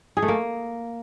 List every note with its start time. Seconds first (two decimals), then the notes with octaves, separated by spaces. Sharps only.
0.17 G#4
0.22 A3
0.28 A#3